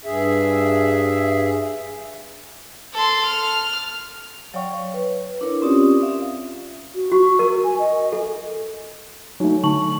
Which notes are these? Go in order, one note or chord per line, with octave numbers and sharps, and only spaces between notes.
G2 G#4 E5
A4 C6
F6
F#3 C#5 D5 F5 G5 C#6
C#5
B4
D4 E4 A#4 C#5
C4 C#4 F4 G4 D5 D#6
D5 E5 F5
F#4
F#4 C#6
A#4
G#5
D#5
A4
F#3 A3 D#4
D3 F#3 A5 C#6 F#7